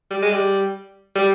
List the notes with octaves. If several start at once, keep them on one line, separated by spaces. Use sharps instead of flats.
G3
G#3
G3
G3